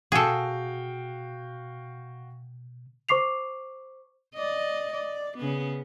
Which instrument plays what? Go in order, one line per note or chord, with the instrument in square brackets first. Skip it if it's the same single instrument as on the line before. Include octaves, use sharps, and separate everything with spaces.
[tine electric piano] B2 D#6 [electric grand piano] F#4 F5 G5 [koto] G#4 A4
[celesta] C5 C#6 D6 C7 F7
[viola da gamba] D5 D#5
D5
C#3 B3